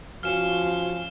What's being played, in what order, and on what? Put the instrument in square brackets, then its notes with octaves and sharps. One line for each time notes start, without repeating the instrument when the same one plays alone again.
[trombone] F3 [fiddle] C#4 F5 [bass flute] F#4 [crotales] F6 E7